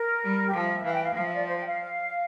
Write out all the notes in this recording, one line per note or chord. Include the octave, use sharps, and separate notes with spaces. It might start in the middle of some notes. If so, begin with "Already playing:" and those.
Already playing: A#4
G3
G4
F3 A4
E5
E5
E3 F5
G5
F5
F3 F5
E5
D5
C5
G5
F5